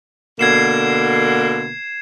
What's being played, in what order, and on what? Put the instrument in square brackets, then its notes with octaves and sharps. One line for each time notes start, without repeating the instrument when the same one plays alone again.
[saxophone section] B2 D3 A#3 [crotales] G#6 C7 E7